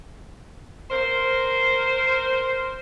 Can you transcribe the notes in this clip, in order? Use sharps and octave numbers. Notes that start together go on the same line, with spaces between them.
A#4 C5